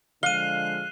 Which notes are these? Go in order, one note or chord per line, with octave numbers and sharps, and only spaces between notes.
D3 F3 G#3 F5 F#6 D#7 G7